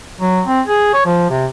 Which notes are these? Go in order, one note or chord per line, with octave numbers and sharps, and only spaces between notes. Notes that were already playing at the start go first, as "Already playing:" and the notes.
F#3
C4
G#4
C#5
F3
C3